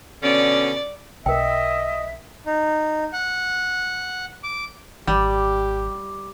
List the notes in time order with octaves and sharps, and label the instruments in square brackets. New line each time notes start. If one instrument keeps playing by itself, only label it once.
[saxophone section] B2 D3 C#4 [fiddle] D5
[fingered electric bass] B1 [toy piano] A#4 G5 [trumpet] D#5 [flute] E5
[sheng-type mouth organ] D#4
F#5
D6
[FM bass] G#1 [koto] G3 [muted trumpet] G4 [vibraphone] D6